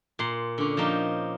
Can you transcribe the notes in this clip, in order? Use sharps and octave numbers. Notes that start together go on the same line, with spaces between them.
A#2 C6
D3 C#4
F3 A#3 D#4 G4